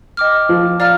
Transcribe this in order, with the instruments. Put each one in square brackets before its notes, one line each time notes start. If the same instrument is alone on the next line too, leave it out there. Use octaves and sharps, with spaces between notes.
[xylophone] D#5 G5 D6 F6
[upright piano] F3
[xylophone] D5 F5 A#5 F6